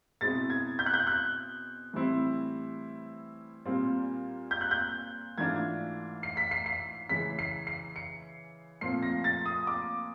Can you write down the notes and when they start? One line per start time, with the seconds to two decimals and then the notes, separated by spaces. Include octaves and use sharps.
0.21 B2 G#3 C4 E4 A6
0.50 G#6
0.79 G6
0.86 F#6
0.94 G6
1.07 F#6
1.93 A2 E3 G3 C4 E4
3.65 A#2 G3 C4 F4
4.51 G6
4.61 F#6
4.71 G6
5.38 G#2 E3 A3 D4 F4 G#6
6.23 C7
6.37 B6
6.51 C7
6.66 C7
7.09 C#3 E3 G#3 B6
7.39 C7
7.67 C7
7.96 C#7
8.81 A#2 F3 A3 C4 F4 C7
9.03 A#6
9.24 A6
9.46 D#6
9.67 D6